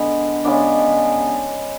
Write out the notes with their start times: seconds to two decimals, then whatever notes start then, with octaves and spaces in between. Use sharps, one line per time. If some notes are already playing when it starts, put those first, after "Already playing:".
Already playing: D3 G#3 B3
0.45 C#3 G#3 B3 D4